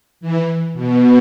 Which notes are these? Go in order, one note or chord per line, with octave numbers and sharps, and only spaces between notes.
E3
B2